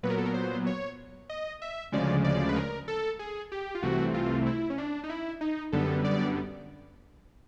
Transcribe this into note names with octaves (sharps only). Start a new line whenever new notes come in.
A#2 F#3 B3 B4
A#4
A4
A#4
C5
C#5
D#5
E5
D2 C#3 F3 G#3 D5
D5
B4
A#4
A4
G#4
G4
F4
C2 C3 E3 A3 C4 F#4
F4
E4
C#4
D4
D#4
E4
D#4
F#2 D3 G3 B3 A4
D5